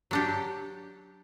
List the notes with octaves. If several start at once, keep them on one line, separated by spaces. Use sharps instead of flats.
F#3 D4 G4